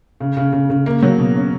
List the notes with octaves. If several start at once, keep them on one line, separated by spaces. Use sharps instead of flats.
C#3
C#3
C#3
C#3
A#3
F#3
B2
C#4